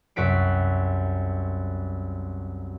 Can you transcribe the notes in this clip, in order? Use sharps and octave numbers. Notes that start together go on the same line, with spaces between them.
C2 F#2 F#4 B6 D7